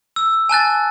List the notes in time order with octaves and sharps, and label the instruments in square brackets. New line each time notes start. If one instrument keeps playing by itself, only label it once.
[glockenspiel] E6
G#5 A5 F#6 A6